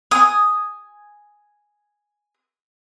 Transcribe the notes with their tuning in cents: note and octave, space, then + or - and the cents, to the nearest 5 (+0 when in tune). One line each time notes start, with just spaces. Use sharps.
G#5 +0 D#6 +0